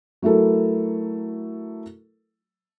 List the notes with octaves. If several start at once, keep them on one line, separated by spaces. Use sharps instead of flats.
F#3 A3 E4 A4 A#4